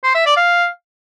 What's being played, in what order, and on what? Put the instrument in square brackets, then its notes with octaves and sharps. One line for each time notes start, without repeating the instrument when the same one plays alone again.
[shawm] C5
E5
D5
F5